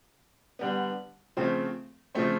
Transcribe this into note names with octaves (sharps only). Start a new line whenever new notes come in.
D3 G3 B3
C#3 F3 A3 C4
C#3 F3 A3 C4